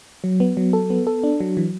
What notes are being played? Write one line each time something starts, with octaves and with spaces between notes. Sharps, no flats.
F#3
B3
F#3
A4
B3
A4
D4
F#3
E3